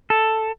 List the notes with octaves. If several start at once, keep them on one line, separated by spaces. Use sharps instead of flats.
A4